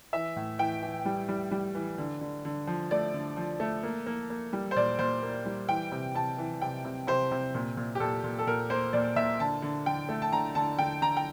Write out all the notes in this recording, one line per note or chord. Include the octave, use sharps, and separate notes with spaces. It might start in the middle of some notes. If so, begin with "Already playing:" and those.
E3 E5
A2
E3 G5
E3
G3
G3
G3
E3
D3
D3
D3
F3
A3 D5
D3
F3
A3
A#3
A#3
A#3
G3
C5
A#2 D5
A#2 C5
A#3
G3
E3 G5
C3
C3 A5
E3
C3 G5
C3
C3 C5
C3
A#2
A#2
G4
A#2 A4
A#2
A4
A#2 A#4
A#3 C5
A#2 D5
A#2 E5
D3 A5
D3
D3 G5
A3
A5
D3 A#5
D3 A5
D3 G5
D3 A#5
G5